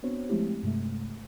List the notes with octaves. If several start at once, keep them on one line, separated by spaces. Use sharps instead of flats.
B3 C4 D4 F#4 C5 C#5
F3 G#3 A3 C4 E4 G4
G2 C3 G#3 A3